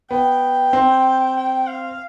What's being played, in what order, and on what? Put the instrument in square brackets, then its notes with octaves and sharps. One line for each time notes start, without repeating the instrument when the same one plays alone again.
[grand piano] B3 [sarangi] G5
[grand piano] C4
[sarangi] G5
F5